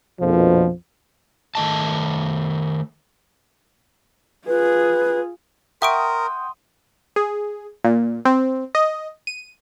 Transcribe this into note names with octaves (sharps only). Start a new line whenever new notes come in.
A#1 F2 B2 F3
D#3 A3 D#5 A5
F4 G#4 B4
A#4 E5 F#5 G5 C6 C#6 D#6 D7
G#4
A#2
C4
D#5
D#7